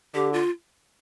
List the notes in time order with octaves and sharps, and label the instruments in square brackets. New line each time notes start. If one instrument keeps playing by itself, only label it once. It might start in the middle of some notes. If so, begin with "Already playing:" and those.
[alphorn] D3 [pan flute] G4
[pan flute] F4